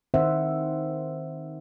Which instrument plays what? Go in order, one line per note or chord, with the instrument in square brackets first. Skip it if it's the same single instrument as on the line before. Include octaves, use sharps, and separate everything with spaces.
[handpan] D#3 C4 C5 E5 F#5